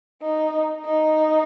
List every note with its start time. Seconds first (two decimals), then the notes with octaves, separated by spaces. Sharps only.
0.22 D#4
0.85 D#4